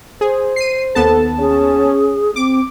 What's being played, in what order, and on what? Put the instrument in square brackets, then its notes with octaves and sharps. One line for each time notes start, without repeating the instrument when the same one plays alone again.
[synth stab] G#4 [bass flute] C5
[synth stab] C7 D#7
[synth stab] D#2 B3 A5 [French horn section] A4
[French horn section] C#4 [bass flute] G#4
[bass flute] C4 [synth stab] D6